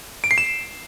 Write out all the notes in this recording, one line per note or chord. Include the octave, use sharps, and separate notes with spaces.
D7
C7
E7